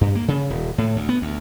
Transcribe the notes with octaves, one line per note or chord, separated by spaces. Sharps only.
G2
A#3
C#3
D#1
A2
D2
B3
D2